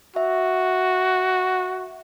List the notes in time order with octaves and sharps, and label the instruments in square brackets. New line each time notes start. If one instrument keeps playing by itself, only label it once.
[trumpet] F#4 [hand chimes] E5